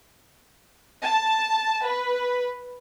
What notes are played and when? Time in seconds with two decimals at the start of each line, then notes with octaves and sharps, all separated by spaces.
1.06 A5
1.85 B4